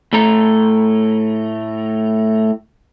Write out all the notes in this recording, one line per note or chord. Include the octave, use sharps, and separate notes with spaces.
A2 A3 A#5